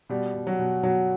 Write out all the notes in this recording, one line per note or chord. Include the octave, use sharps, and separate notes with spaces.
B2 G3
B2
F#3
B2
B2 F#3